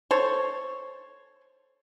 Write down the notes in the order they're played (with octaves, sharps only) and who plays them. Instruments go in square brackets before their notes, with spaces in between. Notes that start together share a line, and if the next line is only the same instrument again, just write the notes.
[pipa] A4 C5 C#5